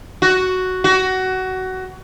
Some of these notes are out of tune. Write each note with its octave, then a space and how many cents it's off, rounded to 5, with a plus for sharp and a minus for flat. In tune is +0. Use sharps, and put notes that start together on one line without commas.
F#4 +5
F#4 +20